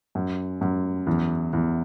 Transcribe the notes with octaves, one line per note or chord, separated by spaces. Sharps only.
F#2
F#2
E2
E2